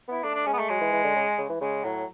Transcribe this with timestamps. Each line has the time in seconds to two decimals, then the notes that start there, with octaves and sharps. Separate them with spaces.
0.08 B3 E4
0.24 A3 D4
0.35 D4
0.47 G#3 C#4
0.53 B3
0.58 A3
0.69 F#3 G#3
0.81 E3
0.93 E3
1.04 D3
1.16 C#3
1.38 C#3
1.50 E3
1.61 C#3 G#3
1.84 A2 F#3